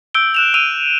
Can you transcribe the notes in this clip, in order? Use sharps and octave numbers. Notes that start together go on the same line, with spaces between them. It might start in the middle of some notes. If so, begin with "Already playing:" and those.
E6 G6 D7 G7
F#6 E7 F7
E6 D#7 F7